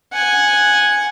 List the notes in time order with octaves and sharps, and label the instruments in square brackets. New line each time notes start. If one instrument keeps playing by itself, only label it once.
[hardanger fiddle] F#5 G#5